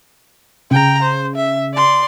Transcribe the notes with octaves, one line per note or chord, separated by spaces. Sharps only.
C#3 G5 A#5
C5
E5
D5 C6